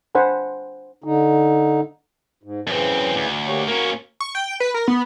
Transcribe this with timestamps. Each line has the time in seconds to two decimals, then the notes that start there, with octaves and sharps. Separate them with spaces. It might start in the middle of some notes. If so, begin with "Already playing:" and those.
0.15 D4 C5 F#5 G#5 B5
1.04 D3 D#4
2.43 G#2
2.67 F#2 C#3 E3 C4
3.15 D2
3.47 A#3 G4 C#5
3.68 A#3 C#4 F#4 A#4
4.20 C#6
4.35 G5
4.60 B4
4.74 A#4
4.88 B3